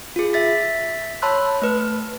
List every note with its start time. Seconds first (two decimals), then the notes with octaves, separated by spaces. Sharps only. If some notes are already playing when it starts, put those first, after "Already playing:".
0.16 F4 G#4
0.33 E5 A6 B6
1.22 C#5 A5 B5 C6 E6 F#6
1.62 A3 B4